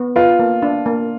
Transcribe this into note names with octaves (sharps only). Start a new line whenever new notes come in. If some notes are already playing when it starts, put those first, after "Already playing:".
Already playing: B3
F4 B4
A#3
D4
A#3